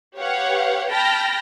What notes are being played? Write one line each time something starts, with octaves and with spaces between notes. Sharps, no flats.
G4 B4 C#5 F5 F#5
G5 A5 B5 F6 A#6